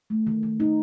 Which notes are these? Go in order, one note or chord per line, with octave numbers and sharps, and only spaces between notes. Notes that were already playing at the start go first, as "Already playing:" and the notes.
A3
D#3
D#3
D#3 D#4